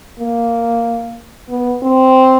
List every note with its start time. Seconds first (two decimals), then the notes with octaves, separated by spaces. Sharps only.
0.19 A#3
1.49 B3
1.83 C4